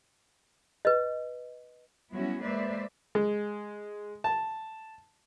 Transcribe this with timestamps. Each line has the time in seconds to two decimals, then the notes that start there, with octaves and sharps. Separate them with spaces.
0.85 B4 D#5
2.12 F#3 G3 B3 C#4 E4 F#4
2.42 G#3 A#3 B4 C5 D5 E5
3.15 G#3
4.24 A5